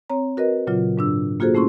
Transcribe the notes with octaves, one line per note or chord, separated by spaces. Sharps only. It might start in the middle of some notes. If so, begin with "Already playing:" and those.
C4 C#5 A#5
F#4 A#4 B4 D#5
A#2 C#3 F#3 F4
G#2 D4 E6
A#3 F4 F#4 G#4 A4 C5
A3 C#4 E4 C6 C#6